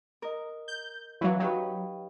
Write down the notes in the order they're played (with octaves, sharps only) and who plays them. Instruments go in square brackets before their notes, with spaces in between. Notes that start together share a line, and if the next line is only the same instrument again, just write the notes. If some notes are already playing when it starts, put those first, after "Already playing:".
[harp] A#4 D#5
[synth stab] G6
[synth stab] E3 F#3 [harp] C#4 C#5 F5
[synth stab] F#3 [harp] D#4 G4 B4